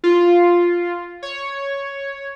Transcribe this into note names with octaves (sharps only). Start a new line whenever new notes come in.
F4
C#5